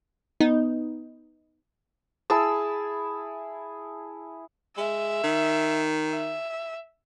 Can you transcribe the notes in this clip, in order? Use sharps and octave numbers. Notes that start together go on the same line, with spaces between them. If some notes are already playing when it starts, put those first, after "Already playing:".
B3 D#4
E4 G#4 A5 E6
G#3 E5
D#3
E5